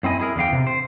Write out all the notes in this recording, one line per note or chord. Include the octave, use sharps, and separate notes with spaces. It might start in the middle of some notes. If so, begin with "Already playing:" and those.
F#2 C4 E4 D#5 G#5
E4 G#4 A#4
E2 D3 F5 G5
C3
C5